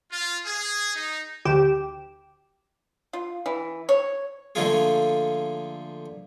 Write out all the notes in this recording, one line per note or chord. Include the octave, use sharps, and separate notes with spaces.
F4
G#4
D#4
D2 G4 G5 D6 E7
F4
E3
C#5
D3 F3 A3 A#3 F4 G#4